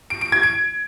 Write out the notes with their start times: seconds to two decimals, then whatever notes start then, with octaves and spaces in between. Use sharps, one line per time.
0.10 D7
0.21 D7
0.32 G#6
0.43 D7